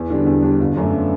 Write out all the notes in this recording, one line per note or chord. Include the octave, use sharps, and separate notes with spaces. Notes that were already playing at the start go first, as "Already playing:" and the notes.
Already playing: E2
D3 G3 D4
E2
D3 G3 D4
G1
F#2 F#3 A3 D4